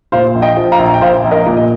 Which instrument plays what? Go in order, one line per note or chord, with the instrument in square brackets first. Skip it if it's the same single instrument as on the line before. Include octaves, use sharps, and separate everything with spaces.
[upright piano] A#2 C5 F5
A#1
D#5 G5
F3
F5 A#5
A#1
A#5
G5
A#1 C5 F5
A#1
A#4 D#5
A#2
D#5